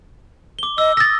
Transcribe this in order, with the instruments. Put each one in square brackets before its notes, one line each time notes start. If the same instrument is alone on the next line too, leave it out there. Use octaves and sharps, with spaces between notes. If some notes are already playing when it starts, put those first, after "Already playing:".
[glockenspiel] D6 G7
[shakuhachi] D#5 [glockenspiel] E6
[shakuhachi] D#6 [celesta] E6 A6 [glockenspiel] A#6